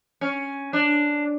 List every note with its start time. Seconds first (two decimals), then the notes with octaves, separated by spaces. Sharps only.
0.21 C#4
0.73 D4